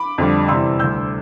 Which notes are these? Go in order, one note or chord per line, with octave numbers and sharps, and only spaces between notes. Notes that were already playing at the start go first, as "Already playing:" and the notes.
Already playing: B5 D6
F2 D3 G3
E2 C3 G3 C6 E6
D2 D3 G3 E6 G6